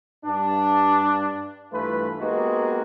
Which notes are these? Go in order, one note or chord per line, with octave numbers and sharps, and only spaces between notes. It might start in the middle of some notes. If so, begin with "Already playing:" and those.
G2 D4
G2 E3 A3 F4 B4
G#3 A#3 B3 D#4 F#4 G4